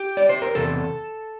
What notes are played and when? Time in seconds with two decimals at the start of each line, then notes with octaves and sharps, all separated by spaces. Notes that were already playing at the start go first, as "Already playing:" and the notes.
Already playing: G4
0.17 D5
0.29 C5
0.42 A#4
0.55 E2 C3 A4